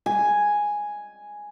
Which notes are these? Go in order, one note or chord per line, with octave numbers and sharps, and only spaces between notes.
G#5